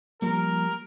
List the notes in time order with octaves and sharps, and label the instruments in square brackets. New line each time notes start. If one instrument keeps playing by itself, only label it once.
[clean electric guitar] F3 G3 A#3 [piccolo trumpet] A#4